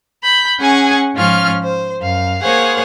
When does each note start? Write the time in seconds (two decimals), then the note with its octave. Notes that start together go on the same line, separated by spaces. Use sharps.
0.23 B5 G6
0.60 C#4 G#4 F#5 G#5 C#6
1.15 G#2 F3 C#4 F4 F6
1.62 C5
2.00 F#2 F5
2.41 A#3 G#4 C5 C#5 F5 F#5